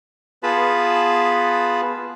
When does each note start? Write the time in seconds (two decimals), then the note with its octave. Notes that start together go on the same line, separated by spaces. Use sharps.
0.43 B3 F4 G#4 B4 A5 B5